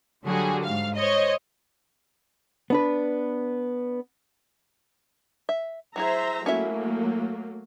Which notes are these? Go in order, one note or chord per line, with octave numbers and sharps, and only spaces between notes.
D3 F#3 G3 F#4 G#4
G#2 F5
C5 C#5 D#5
B3 D4 B4
E5
F#3 E4 G#4 C5 E5 A#5
F#3 A3 A#3 C#4 E4 E5